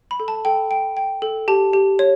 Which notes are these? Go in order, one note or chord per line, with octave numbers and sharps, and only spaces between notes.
B5
A4
A5
A4 G5
G5
G5
A4
G4 A5
G4
C#5